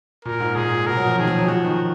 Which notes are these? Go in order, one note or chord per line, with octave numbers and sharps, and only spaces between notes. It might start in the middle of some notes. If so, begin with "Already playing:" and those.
A#2 A#4
G#2
A#2 G#4
B2 A#4
F#3
F3
D#3 G#4
F3
F#3
F3 F#4
D#3